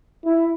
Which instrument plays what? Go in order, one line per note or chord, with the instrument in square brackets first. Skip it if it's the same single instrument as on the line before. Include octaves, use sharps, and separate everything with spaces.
[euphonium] E4